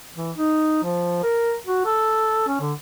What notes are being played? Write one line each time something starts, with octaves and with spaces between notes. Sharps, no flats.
E3
D#4
F3
A#4
F#4
A4
C#4
D3